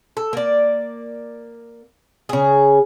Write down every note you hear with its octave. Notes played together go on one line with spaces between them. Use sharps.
A4
A#3 D5
C#3 G#4